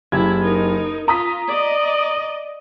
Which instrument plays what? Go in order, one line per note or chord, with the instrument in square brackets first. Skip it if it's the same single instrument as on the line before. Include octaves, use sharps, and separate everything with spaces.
[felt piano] F#1 G4 G#6 [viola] E4
[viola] D#4 A#4
[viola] F4 [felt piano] A#5 D#6 B6
[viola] D5 D#5